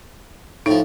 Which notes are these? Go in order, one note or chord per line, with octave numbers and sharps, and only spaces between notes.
A2 F3 D#4